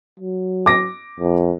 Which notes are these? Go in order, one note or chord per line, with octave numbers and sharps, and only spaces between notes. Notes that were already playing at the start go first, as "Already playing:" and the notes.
F#3
D6 A#6
F2